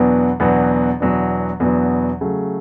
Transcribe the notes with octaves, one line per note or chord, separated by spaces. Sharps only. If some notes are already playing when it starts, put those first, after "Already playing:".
Already playing: E2 B2 F#3 B3 D4
E2 B2 F#3 B3 D4
E2 B2 F#3 B3 D4
E2 B2 F#3 B3 D4
C#3 F#3 A3